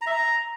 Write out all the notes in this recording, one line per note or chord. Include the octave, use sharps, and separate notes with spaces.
A#5
E5
A#5